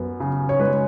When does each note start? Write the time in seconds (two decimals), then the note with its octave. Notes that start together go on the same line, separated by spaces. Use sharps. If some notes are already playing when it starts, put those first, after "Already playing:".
Already playing: F#2 B3
0.20 C#3
0.49 C#5
0.59 G#3 B4